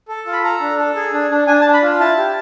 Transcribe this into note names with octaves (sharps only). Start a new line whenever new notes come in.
A4
F4
B5
A4 A#5
D4
A4
G#4
D4
D4
D4 G#5
A5
D4
B5
F4
E4 A5
G4